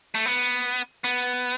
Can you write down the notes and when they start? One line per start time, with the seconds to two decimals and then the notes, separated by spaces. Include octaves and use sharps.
0.15 A3
0.26 B3
1.04 B3